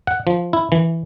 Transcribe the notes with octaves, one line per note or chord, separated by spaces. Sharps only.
F#5
F3
E4
E3